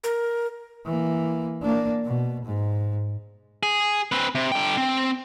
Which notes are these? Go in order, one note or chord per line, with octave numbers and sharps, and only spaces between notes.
A#4
E3 A#3
A#3 D4
B2
G#2
G#4
C4 B4
C3
D3 G5
C4